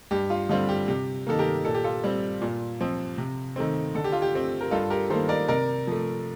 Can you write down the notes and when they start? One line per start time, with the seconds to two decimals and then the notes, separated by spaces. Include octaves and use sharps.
0.11 G2 G4
0.30 F4
0.49 D3 G3 C4 F4
0.69 G4
0.88 C3 G4
1.27 D#3 A#3 A4
1.39 G4 A#4
1.65 A#2 A4
1.74 G4
1.84 F4 A4
2.04 G3 C4
2.42 A#2
2.81 F3 C4
3.18 C3
3.56 D#3 A3 C4
3.95 D3 A4
4.04 G4
4.12 F4
4.22 G4
4.34 A3 C4
4.61 A#4
4.71 G2 F4 A4
4.90 G4 A#4
5.10 D#3 A#3 A4 C5
5.29 A#4 D5
5.48 C3 A#4 D5
5.87 F3 A3